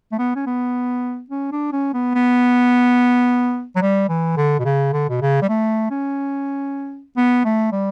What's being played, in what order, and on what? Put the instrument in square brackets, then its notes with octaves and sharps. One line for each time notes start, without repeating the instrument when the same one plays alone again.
[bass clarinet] A3
B3
C#4
B3
C#4
D4
C#4
B3
B3
F#3
G3
E3
D3
B2
C#3
D3
B2
C#3
G3
A3
C#4
B3
A3
G3